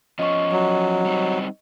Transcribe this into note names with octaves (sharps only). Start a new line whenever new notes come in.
F3 C#4 D#5 C#6
F#3
G3 C4 D#4